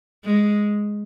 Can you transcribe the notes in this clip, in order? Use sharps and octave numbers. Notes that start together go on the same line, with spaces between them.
G#3